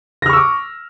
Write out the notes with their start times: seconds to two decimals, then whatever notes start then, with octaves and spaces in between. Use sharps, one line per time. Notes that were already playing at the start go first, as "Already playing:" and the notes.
0.22 A#6
0.26 F6
0.29 C#6
0.33 E6
0.37 D6